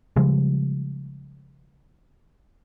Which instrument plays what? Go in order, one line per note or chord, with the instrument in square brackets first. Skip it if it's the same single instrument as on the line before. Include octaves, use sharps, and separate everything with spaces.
[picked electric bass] C#3 F3 G3 G#3